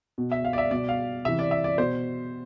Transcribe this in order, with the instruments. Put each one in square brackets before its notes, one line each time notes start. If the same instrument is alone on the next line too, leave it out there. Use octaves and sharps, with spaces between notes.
[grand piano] B2
E5
F5
D5
E5
B2 D5
F5
C3 E3 E5
D5
E5
D5
B2 C5